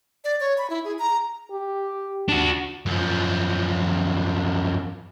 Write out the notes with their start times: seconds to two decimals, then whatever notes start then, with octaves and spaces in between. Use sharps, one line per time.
0.24 D5
0.40 C#5
0.58 B5
0.70 E4
0.85 G#4
0.99 A#5
1.51 G4
2.29 D4 F#4
2.86 F#2 F3